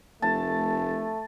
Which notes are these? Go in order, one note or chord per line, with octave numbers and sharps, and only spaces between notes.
F1 A3 A5